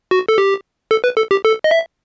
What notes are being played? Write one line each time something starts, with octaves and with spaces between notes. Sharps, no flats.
F#4
A4
G4
A4
B4
A4
G4
A4
D#5
E5